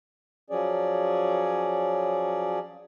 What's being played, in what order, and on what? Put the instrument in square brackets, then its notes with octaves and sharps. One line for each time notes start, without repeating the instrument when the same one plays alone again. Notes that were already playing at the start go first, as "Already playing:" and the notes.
[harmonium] F3 F#3 C#4 G#4 D5